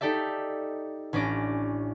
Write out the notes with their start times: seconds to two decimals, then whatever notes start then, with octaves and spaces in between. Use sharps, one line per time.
0.01 D#4 G4 A4 D5 E5
1.13 A1 C#4 D4 D6 A#6